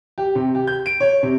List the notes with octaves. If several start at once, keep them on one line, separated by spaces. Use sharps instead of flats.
G4
C3
G4
G6
D7
C#5
C3